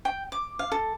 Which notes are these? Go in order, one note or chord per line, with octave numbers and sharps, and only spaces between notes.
G5
D6
F5
A4